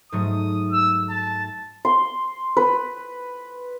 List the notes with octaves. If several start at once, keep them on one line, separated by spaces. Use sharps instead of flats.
G#2 F#3 A3 D#6
E6
A5
C6
B4